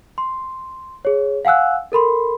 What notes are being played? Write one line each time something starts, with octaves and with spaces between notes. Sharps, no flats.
C6
G#4 C#5
F5 F#5 G#5 E6 F#6
A4 A#4 B5 C6